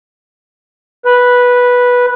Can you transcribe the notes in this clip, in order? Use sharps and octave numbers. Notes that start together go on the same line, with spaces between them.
B4